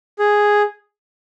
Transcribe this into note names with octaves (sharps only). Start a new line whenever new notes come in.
G#4